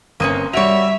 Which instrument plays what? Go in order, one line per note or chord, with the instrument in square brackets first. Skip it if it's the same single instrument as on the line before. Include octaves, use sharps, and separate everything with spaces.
[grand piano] G1 D#6 D#7 [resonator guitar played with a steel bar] A#3 C4 C#4
[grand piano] G3 D7 F7 [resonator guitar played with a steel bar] F#4 C#5 [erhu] E5